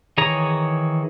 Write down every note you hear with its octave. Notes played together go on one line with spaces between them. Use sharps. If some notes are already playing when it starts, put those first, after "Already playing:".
D#3 E3 G#4 C#5 A#5